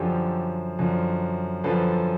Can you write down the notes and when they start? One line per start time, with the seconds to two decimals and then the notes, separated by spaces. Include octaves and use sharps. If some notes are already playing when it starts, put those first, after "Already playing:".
Already playing: F#2 D3 F3 G4 A4
0.79 F#2 D3 F3
1.64 F#2 D3 F3 A4 B4